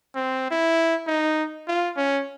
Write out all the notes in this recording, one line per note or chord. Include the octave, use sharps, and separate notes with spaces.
C4
E4
D#4
F4
C#4